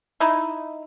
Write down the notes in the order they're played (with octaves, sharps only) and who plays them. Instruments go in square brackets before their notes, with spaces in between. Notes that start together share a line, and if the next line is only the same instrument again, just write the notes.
[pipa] D#4 E4